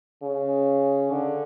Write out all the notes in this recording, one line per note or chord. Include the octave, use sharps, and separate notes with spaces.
C#3
D3